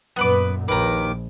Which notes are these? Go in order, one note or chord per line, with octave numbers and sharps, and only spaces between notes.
F#2 A#2 B3 B4 D6
A#1 D#2 D#3 B4 A#5 D6